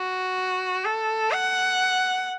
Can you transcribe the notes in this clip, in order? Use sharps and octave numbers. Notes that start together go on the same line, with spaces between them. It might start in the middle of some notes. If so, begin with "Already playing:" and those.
Already playing: F#4
A4
F#5